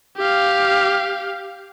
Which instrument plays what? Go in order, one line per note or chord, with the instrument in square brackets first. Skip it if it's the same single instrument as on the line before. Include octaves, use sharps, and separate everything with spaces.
[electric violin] G4 F5